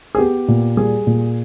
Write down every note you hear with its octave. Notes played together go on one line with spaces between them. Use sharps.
G#4
B3 G4
A#2
G3 G#4
A#2